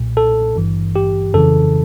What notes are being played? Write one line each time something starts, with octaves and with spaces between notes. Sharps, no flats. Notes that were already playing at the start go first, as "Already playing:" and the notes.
Already playing: B1 A#2
A4
G#1 G2 E3
G4
F2 C#3 E3 A4